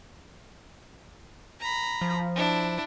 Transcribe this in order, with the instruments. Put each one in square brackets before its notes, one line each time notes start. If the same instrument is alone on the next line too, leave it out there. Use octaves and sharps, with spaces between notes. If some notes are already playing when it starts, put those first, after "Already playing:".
[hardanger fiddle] A#5 B5
[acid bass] F3
[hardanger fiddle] D4 E4